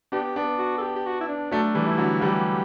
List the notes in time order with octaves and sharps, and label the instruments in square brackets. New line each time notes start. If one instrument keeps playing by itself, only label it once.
[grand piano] B3 D4 [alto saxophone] G4
[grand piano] B3 D4
[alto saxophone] F#4
A4
G4
G4
F#4
E4
D4
[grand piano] F#3 A3 [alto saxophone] D4
[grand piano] E3 G3
[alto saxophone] E4
[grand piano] D3 F#3
[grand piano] E3 G3 [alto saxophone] G4